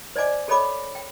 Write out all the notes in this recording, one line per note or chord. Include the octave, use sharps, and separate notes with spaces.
C5 D5 D#5 G#5 D6
G#4 A4 C#5 D#5 B5 D6
G5